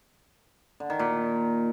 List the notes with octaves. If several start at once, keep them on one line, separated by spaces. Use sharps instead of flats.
D3
D#3
A#2